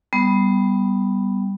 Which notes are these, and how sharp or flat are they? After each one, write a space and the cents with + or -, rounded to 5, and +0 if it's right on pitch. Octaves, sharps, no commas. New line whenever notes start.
G3 +0 B3 +0